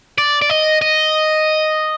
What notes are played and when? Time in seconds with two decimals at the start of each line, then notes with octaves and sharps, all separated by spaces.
0.18 D5
0.42 D5
0.50 D#5
0.82 D#5